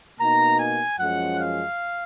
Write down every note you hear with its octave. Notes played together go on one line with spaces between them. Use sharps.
B2 A#3 D#4 A#5
G#5
F#2 F3 G#3 C#4 F#5
F5